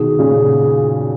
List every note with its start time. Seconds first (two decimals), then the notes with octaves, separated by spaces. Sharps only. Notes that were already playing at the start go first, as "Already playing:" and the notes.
Already playing: B2 D#3 G#4
0.19 A#2 C#3